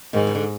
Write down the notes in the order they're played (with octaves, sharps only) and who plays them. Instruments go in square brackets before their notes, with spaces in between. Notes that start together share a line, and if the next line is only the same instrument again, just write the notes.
[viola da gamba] G#2 [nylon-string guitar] D#3
[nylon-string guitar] C#3
D3